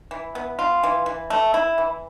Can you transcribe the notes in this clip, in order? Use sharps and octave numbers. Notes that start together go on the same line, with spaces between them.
E3
B3
F4
E3
E3
A3
E4
E3